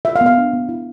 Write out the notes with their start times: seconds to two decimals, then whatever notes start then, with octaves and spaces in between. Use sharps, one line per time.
0.05 F4 E5
0.16 F5
0.21 B3
0.26 F5
0.38 D4
0.53 B3
0.69 E4